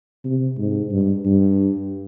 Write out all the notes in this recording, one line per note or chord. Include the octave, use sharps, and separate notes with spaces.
C3
G#2
G2
G2